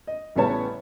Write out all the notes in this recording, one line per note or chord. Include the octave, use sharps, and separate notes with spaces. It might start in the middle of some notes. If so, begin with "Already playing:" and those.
D#5
A1 C#3 G3 B3 C#5 A5